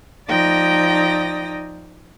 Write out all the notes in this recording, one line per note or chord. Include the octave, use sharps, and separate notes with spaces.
F3 D#4 D5 G5 D#6 A#6